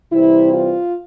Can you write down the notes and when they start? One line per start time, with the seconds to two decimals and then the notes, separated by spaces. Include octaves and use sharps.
0.12 C3 E3 G3 C4 E4
0.53 F4